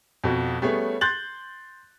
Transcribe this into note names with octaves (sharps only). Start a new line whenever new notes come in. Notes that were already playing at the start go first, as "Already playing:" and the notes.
F2 B2 F#4
G3 A3 B3 C#4 G#4 C#5
C6 F#6 G6 A6 F#7